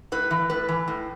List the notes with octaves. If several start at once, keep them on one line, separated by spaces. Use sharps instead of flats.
A2 B4
E3
A2 B4
E3
A2